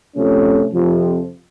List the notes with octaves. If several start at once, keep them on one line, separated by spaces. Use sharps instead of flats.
C3 F3 A3 C#4
F2 C3 F3